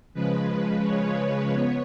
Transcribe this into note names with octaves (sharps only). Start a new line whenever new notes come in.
C#3 F3 G#3 B4
C#5
B3 C#5